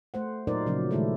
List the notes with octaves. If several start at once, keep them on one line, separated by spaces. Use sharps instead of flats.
A3 C5 F#5
A#2 F#3 D#4 A#4 C5 D5
C#3 F3 F#3 A#3
A#2 D#3 G#3 A3 E4 A4